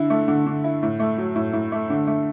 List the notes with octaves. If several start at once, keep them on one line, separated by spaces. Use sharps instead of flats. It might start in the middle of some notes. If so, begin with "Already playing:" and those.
Already playing: D3 E4
A3
D3
D3
E4
A2
A3
F#3
A2
A2
A3
D3
A3